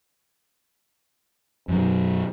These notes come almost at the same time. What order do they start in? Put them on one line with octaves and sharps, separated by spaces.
F#2 F#3 B2